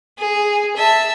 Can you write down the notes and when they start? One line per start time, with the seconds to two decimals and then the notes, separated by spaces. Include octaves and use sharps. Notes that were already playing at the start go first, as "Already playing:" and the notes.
0.18 G#4
0.77 E5 A5